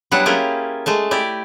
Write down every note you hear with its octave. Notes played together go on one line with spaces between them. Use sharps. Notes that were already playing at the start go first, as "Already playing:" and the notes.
F#3 G3 B3 D4 E4 F#5
A#3 C#4 E4 F4 G4 G#4
G#3 A3 A5
E4 G4 D5